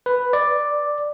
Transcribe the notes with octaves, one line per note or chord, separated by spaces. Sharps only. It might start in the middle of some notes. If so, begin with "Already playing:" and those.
B4
D5